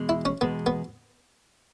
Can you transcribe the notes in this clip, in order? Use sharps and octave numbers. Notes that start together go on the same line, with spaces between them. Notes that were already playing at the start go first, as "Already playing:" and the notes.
Already playing: E2 B2 G#3
E4
C#4
E2 B2 G#3 B3
B3